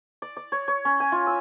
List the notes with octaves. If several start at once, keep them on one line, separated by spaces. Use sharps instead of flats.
D5
D5
C#5
C#5
C#4
G#5
F4
E6